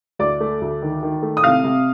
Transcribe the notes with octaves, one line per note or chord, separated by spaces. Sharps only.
D2 D5 D6
A3
D2
D#3
D#3
A3
D#6
C3 F5 F6
C3